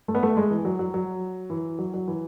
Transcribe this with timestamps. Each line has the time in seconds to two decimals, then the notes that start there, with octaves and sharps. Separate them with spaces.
0.08 A3
0.15 B3
0.23 A3
0.37 G#3
0.51 E3
0.65 F#3
0.79 F#3
0.94 F#3
1.50 E3
1.79 F#3
1.94 F#3
2.08 E3